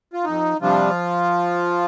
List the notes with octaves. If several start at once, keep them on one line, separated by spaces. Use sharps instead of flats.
F4
F2 D#4
C3 F3 G3 D4 F4